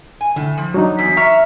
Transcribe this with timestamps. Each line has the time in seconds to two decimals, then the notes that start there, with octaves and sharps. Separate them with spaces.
0.21 G#5
0.36 A2 D3
0.58 F3
0.74 F#3 D4 D#4
0.99 E2 B6
1.17 E5 A#5 C#6 F6